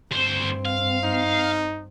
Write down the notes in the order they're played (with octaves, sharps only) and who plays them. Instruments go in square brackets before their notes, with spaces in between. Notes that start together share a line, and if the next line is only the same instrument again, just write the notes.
[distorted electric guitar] D2 C5 [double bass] G2 C4
[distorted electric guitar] F5
[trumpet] D#4